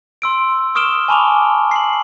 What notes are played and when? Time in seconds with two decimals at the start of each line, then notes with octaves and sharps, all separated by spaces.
0.22 C6 E6 D7
0.75 C#6 D#6 F6 D7 E7 G7
1.08 G#5 A5 B5 C#6 D6 F7
1.71 C7 F#7